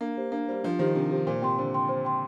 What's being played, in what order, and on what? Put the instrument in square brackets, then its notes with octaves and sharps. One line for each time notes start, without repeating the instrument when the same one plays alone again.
[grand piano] A#3 [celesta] D4
[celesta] G4 C5
[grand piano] A#3 [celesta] D4
[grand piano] G3 [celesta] G4 C5
[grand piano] F3 [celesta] D4
[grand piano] D#3 [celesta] G4 C5
[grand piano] C3 [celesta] D4
[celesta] G4 C5
[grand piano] A#2 [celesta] C5
[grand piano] C3 [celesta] G5 C6
[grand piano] D3 [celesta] C5
[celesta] G5 C6
C5
G5 C6